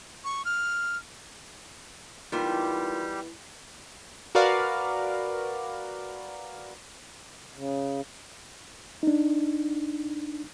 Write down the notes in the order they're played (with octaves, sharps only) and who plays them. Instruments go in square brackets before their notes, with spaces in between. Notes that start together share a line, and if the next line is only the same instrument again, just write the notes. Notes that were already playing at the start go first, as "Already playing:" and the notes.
[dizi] C#6
F6
[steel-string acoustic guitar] E3 G#3 B3 [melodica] G3 G4 [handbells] D#4 F4 A#4
[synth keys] F#4 A#4 B4 D5 F5
[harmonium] C#3
[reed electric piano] D4 D#4